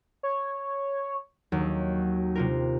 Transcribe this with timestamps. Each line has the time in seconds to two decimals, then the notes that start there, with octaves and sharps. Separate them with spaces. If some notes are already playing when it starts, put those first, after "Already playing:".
0.23 C#5
1.52 D#2 F#3
2.35 C3 F4 A#4